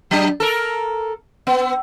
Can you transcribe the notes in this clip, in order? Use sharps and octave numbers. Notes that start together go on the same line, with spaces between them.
F#3 D4
A4 A#4
B3